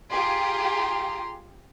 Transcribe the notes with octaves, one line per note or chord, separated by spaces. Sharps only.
F4 G4 G#4 A#5 C6